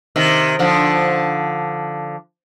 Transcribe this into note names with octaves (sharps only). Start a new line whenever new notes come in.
C3 D#3
D3 F3